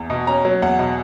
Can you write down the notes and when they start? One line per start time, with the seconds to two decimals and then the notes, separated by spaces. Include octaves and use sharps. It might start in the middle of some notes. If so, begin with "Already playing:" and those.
Already playing: E2
0.10 B2
0.27 C#4 A#5
0.45 F#3
0.62 E2 F#5
0.79 B2